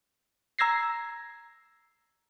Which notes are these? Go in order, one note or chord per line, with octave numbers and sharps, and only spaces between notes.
A#5 E6 G#6 A#6 C7